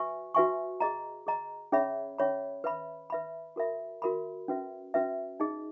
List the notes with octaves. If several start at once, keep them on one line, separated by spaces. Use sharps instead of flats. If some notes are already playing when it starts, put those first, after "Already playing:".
Already playing: F#4 B4 E5 G#5 C#6
F#4 B4 E5 G#5 C#6
G#4 D#5 A#5
G#4 D#5 A#5
C#4 G#4 C#5 E5 B5
C#4 G#4 C#5 E5 B5
B4 E5 B5
B4 E5 B5
F#4 A#4 E5 B5
F#4 A#4 E5 B5
C#4 F#4 B4 E5
C#4 F#4 B4 E5
D#4 G#4 D#5